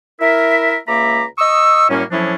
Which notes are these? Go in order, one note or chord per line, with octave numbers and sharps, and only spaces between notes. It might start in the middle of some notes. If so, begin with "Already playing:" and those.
E4 A#4 E5
C#2 A#3 E5 A#5 B5 D6
D#5 C#6 D#6 E6
F#2 A2 G3 A#3 C#4
A2 F3 F#3 C#4 D4 E4